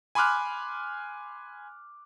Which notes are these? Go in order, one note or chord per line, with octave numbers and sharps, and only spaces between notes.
G#5 B5 C6 D6 F6 F#6